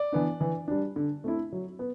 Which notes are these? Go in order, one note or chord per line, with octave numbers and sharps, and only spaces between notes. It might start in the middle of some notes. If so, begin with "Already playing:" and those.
Already playing: D5
E3 B3 D4
E3
G3 D4
D3
A3 C4 E4
F#3
B3